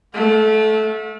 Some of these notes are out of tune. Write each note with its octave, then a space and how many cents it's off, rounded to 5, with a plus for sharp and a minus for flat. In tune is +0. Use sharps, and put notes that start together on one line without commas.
A3 -20 F5 +45